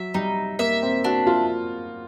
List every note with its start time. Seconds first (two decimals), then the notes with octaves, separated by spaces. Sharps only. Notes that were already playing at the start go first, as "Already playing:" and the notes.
Already playing: F#3 E5
0.14 G3 D#4
0.59 A#3 E5
0.82 C4
1.04 D4 F#4
1.27 F4